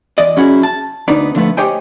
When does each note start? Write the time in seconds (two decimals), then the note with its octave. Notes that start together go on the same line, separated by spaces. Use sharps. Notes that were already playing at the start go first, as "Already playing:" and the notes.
0.18 E2 D5 D#5
0.37 F#3 C#4 E4 F#4 G#4
0.63 A5
1.08 D2 B3 D4 D#4 D5
1.35 D3 F3 A3 B3
1.57 G4 C5 C#5 D#5 G5 G#5